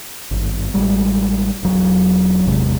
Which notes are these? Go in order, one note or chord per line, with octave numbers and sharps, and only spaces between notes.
G#1 G2
A1 G3 G#3
E1 F#3
G#1 E2 C3 G#3